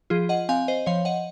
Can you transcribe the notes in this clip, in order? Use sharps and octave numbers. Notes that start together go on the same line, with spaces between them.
F3 F4 G#4
D#5 F#5
C4 F5 G#5
C5 D#5
F3 C#5 F5
D#5 F#5